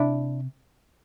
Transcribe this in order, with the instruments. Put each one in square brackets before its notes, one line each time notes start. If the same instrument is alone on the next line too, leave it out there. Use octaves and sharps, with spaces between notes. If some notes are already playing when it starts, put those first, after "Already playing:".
Already playing: [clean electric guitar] C3 [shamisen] D4 E4